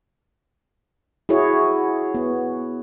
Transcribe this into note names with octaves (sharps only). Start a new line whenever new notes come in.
E4 F#4 G#4 C#5
B3